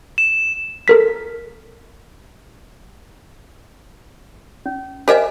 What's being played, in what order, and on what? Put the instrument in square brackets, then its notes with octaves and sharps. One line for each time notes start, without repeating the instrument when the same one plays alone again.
[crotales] E7
[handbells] A4 A#4 B6
[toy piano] C#4
[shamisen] G4 A#4 E5 [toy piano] C5 D#5 G#5